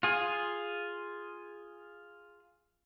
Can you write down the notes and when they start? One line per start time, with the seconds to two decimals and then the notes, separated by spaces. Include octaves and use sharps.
0.03 F4 G#4